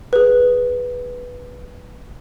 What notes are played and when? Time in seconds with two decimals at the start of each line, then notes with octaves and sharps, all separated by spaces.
0.13 G#4 B4